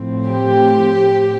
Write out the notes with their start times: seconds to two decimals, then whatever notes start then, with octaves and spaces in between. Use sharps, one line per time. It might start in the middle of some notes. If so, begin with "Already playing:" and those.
Already playing: A2 F3 C4
0.29 G4